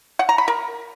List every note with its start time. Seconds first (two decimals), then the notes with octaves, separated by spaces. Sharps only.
0.19 F#5
0.29 A#5
0.38 B5
0.48 A#4